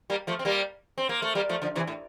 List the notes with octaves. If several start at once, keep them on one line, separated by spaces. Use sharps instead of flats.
G3 A#3
F3 A3
C4
G3 A#3
C4
A#3
A3
G3 A#3
F3 A3
D3 F3
C3 E3
A2